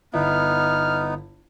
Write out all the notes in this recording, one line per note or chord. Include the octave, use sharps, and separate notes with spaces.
G1 B3 D#4 E4 F6